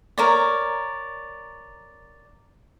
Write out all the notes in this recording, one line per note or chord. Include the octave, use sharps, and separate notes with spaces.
A#4 C#5 D5